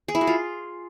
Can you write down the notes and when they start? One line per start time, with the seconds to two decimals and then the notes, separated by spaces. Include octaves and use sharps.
0.08 G#4
0.15 E4
0.21 F#4
0.27 F4